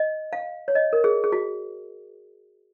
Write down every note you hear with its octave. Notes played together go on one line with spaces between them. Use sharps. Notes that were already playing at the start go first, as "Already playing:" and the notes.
Already playing: D#5
F5
C#5
D#5
A#4
G#4
G#4
F#4